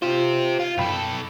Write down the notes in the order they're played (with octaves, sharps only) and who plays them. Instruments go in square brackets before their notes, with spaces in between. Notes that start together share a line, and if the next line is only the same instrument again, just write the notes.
[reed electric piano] F4 [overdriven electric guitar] G4 C5
[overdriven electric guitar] F4
[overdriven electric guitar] B1 A4 [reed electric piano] F#2 G5 B5